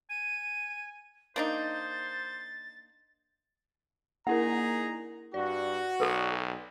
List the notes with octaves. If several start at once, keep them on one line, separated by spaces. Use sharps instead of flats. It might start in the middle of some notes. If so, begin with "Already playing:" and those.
G#5 D#7
A#3 D4 D#4 C5 A6
A#3 D#4 E4 G#4 A#4 F#5 A#5
G2 F#4 D5
B1 A4 B4